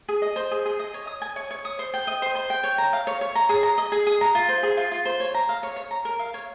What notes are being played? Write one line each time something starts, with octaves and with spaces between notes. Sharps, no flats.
G#4
D#5
C5
G#4
G#4
D#5
C#5
D#6
G#5
C#5
C#5
D#6
C5
G5
D#5
C5
C5
G5
C#5
A#5
F5
C#5
C#5
A#5
G#4
A#5
D#5
G#4
G#4
A#5
F4
C5
G#4
F4
F4
C5
C#5
A#5
F5
C#5
C#5
A#5
A#4
F5
C#5